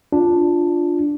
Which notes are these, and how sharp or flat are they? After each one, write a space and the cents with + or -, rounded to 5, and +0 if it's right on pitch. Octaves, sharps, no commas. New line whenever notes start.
D4 +0 F4 +0